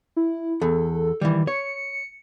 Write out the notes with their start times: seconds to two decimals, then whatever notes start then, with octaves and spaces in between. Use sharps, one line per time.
0.17 E4
0.61 E2 A4
1.21 D#3 E3 G3
1.47 C#5 C#7